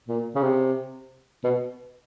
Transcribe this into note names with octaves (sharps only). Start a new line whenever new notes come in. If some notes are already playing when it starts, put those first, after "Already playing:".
A#2
C#3
C3
B2